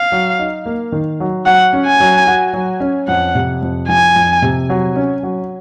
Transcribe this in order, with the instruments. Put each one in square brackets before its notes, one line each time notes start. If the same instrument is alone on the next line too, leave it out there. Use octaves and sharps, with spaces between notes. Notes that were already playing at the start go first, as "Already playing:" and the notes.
Already playing: [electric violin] F5
[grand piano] F#3
D#4
A#3
D#3
F#3
[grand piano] F#3 [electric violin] F#5
[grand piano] C#4
[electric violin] G#5
[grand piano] F#3
F#4
F#3
C#4
[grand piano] F2 [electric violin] F#5
[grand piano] C3
F2
[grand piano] F3 [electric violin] G#5
[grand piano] F2
C3
F#3
C#4
F#3